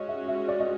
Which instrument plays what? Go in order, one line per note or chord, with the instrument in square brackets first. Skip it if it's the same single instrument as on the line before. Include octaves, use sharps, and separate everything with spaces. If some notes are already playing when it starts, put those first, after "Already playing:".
Already playing: [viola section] G#3 C#4 F#4 [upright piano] D#5
[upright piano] E5
E5
D5
D#5